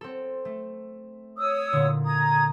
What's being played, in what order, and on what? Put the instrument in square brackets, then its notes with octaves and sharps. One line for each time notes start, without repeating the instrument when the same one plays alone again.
[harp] C4 A4
A3
[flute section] C#5 D#6 E6
[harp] A#2 D3
[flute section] A#5 D#6 G#6